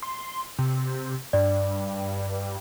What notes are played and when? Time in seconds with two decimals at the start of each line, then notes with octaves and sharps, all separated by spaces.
0.02 C6
0.58 C3
1.33 G2 D5